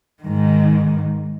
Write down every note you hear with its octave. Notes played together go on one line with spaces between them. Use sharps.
G#2 D#3